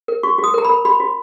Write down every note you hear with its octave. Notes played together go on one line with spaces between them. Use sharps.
A#4
F#4 C#6
F#4
D#6
A#4 A#5
A#4 B5
F#4 B5
F#4